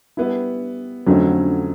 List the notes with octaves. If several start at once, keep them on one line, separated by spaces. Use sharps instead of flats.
G3 B3 E4
F2 D3 F#3 A3 C#4